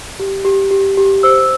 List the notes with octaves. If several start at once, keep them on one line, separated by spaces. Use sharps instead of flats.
G4
G4
G4
G4
C5 E6